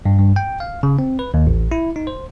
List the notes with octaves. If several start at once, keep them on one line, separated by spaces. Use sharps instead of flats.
G2
G2
G5
F5
C#3
C4
B4
D#2
A1
E4
D#4
C5